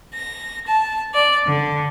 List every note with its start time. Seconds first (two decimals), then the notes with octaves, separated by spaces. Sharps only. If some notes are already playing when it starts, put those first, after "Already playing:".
0.12 A#6
0.66 A5
1.13 D5
1.47 D3